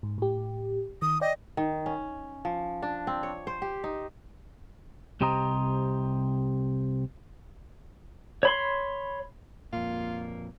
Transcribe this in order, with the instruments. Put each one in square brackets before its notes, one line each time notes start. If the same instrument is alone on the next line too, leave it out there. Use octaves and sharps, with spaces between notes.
[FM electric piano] G#2
A2 G4
[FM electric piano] D#3 [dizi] D#6
[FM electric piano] D5 G5 [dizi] D#5
[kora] D#3
C#4
F3
D4
C4
C#5
C5
G4
D#4
[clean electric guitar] C2 C3 G4 C5 D#5 A#5
[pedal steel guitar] C#5 B5 C6
[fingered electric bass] F2 A#2 [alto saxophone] A#3 [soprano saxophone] F4